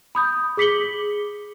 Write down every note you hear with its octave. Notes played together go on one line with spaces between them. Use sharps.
B5 D#6 G6
G#4 D6 B6 C#7 F#7 G7